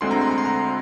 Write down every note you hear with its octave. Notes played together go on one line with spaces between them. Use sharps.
D2 D3 G#3 C4 C6
A#5
C6
A#5
C6
A#5